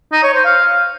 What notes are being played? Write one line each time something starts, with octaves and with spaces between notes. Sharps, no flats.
D#4
C#5
C5
F5